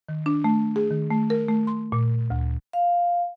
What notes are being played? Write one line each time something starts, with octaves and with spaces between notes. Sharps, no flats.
D#3
D4
A3
G#4
D#3
A3
A#4
A3
C6
A#2
D2
F5